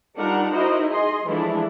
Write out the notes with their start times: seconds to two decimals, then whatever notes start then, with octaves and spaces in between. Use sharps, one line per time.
0.17 G3 D4 D#4 F4 A#4 F#5
0.52 D#4 E4 F#4 A#4 C5 D#5
0.89 G#4 D#5 C6
1.27 E3 F3 G#3 A3 D4 E4